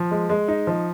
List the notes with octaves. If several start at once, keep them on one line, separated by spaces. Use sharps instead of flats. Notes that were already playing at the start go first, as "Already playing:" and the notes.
Already playing: F3
G#3
G#3
D#4
F3